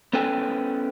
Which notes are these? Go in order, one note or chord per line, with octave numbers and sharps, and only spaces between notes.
B3 C#4 A4 B4 G5 G#5